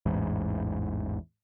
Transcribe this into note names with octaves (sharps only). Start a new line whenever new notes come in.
A1 E2 G#2